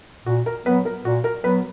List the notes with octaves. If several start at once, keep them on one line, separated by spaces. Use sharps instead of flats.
A#2 F#4
A#4
F#3 B3 B4
A#4
A#2 F#4
A#4
F#3 B3 B4